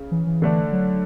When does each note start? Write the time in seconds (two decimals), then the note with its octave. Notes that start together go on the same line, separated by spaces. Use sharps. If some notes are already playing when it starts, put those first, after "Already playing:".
Already playing: C#3
0.11 E3
0.27 E3
0.42 D3 A3 D4
0.72 F#3